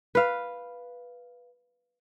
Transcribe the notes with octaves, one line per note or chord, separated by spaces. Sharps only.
B4 F5